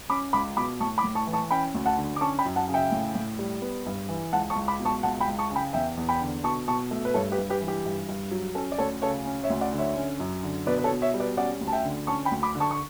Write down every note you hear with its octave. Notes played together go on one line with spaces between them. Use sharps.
C#4 B5 D6
C#2 B5 D6
B2 B5 D6
A2 A5 C#6
B5 D6
A2
A5 C#6
E3
A5 C#6
C#4 G5 B5
D2
F#5 A5
D3
D6
C#4 A5 C#6
G5 B5
F#2
F#5 A5
C#3
E5 G5
A2
A2
G3
B3
G2
E3
C#2 F#5 A5
A5 C#6
C#2
B5 D6
B2
A5 C#6
C#2 F#5 A5
G5 B5
C#2
A5 C#6
C#3 G5 B5
E2 E5 G5
E2
G5 B5
D3
B2 A5 C#6
B2 A5 C#6
A3
B4
G2 A4 C#5
G4 B4
G2
G4 B4
E3
G4
G2
G2
F#3
C#4 A4
D5
D2 A4 C#5
C#3 A4 C#5
C#4
C#5 E5
D2
D5 F#5
D3
C#5 E5
C#4
F#2
D3
B2 B4 D5
B4
A4 C#5
B2
C#5 E5
G3
B4 D5
C#4 D5 F#5
D2
A5
E5 G5
D3
C#4 A5 C#6
G5 B5
D2
B5 D6
D3
A5 C#6
C#6